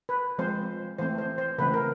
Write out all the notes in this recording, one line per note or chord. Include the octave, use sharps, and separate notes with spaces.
B4
F3 G#3 C4 C5
E3 A3 C4 C5
C5
C5
C#3 E3 A3 C4 B4
A#4